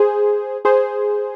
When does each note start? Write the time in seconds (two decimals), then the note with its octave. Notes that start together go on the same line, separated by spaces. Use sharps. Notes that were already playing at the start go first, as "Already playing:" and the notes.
Already playing: G#4 C5
0.65 G#4 C5